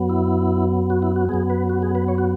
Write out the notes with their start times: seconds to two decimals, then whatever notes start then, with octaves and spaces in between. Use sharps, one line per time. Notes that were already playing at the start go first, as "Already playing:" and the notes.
Already playing: F#2 F#3 B3
0.10 E4
0.90 F#4
1.02 E4
1.16 F#4
1.29 F#2 F#3 B3 G#4
1.50 B4
1.69 F#4
1.82 G#4
1.95 B4
2.08 C#5
2.18 F#4